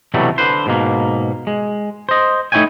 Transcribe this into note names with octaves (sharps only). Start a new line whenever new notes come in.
C2 B2 E3 F#3 G3 A3
D3 B4 C5
G#2 B2 A#3
G#3
C5 D#5
A3 D#4 E4 C#5 G5 G#5